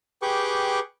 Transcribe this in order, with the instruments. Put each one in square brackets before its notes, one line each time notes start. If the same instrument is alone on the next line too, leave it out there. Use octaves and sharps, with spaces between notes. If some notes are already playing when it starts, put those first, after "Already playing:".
[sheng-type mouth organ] G4 G#4 B4 G5 C#6 D6